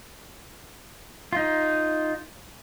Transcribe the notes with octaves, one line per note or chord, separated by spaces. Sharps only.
D#4 F4